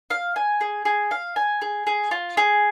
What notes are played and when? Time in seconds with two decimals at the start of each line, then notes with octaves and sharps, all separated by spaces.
0.10 F5
0.36 G#5
0.61 G#4
0.85 G#4
1.11 F5
1.36 G#5
1.62 G#4
1.87 G#4
2.11 F4
2.37 G#4